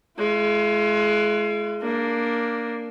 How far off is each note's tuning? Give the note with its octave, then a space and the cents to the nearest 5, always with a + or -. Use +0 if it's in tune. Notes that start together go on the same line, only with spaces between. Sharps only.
G#3 +30 F4 -40
A#3 +0 D4 +0